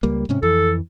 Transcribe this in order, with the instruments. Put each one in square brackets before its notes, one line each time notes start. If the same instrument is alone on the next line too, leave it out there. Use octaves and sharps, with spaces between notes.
[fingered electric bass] C#2 G3 A#3
G#2 C3 C#4
[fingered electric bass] F2 E3 [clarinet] A4